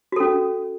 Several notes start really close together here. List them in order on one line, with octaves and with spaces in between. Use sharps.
F#4 A4 C#4